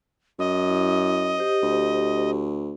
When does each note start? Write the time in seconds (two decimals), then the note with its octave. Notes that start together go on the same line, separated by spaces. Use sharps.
0.39 F#2 D#5
0.69 E4
1.39 G4 C5
1.62 D2